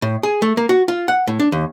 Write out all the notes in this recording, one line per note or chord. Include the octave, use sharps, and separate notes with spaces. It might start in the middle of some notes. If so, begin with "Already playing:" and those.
A2
G#4
A3
A#3
F#4
F4
F#5
A2
D4
D#2